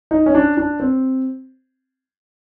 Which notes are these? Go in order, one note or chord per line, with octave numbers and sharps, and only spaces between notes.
D#4
C#4
D4
D4
C4